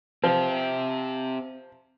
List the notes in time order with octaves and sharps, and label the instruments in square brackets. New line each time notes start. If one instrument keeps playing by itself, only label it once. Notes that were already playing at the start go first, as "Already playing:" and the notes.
[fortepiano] F3 [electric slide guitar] C4 G4